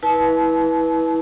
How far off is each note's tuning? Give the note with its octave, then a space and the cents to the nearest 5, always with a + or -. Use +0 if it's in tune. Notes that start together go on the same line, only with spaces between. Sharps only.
E4 -20 B4 -15 A5 -30